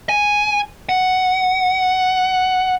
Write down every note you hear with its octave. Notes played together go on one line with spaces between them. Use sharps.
G#5
F#5